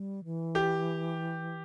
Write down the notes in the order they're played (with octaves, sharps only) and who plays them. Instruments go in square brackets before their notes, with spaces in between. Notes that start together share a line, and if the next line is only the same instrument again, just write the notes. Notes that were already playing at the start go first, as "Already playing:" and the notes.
Already playing: [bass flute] G3
E3
[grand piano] G4